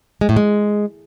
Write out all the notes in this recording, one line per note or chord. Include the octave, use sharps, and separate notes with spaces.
G#3
A2
G#3